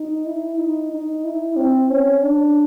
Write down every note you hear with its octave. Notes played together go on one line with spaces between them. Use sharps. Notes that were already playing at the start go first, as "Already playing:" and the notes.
Already playing: D#4
E4
D#4
D#4
E4
C4
C#4
D4